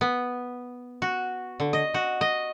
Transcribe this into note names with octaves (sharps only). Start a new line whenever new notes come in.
B3
F#4
D3
D#5
F#4
D#5